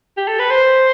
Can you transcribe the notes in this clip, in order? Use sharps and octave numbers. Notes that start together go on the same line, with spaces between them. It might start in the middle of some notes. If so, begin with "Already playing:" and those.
G4
A4
B4
C5